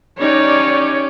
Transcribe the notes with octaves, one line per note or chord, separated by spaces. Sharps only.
C#4 D#4 G4 C#5 D5